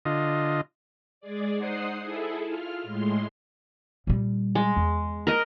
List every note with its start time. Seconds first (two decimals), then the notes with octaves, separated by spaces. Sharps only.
0.05 D3 F4 D#5
1.21 G#3 G#4 D5
1.55 D#4 C5 F#5 D#6 C7
2.01 E4 G#4 A4
2.48 F4 F6
2.83 A2 G#3 C6
4.07 A#2 G3
4.55 G#3
4.77 E2
5.27 A#4 D#5